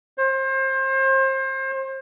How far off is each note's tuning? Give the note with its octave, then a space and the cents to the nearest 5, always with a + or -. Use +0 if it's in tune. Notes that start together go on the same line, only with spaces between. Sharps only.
C5 +30